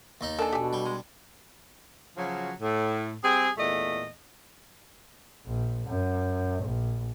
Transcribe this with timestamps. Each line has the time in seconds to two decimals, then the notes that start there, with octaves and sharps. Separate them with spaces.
0.21 D#2 D#4
0.39 D4 A4 A#4 G#5
0.53 B2 G4 G#5
0.73 G3
0.85 G#3
2.17 C#3 F3 F#3
2.61 A2
3.23 G3 C4 G#4
3.58 E2 A#2 A3 D#5
5.46 A#1
5.87 F#2
6.63 A#1